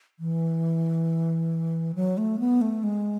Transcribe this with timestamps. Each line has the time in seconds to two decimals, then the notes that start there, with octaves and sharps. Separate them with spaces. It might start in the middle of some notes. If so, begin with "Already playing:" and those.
0.20 E3
1.95 F#3
2.18 A3
2.39 B3
2.61 A3
2.83 G#3